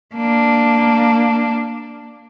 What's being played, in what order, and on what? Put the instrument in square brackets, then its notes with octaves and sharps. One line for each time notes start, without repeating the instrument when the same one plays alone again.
[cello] A#3 D4